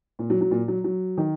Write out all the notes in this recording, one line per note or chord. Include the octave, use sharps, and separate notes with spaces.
A#2
F#3
F#3
A#2
F#3
F#3
D#3